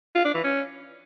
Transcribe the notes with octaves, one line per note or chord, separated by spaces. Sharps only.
F4
D4
E3
C#4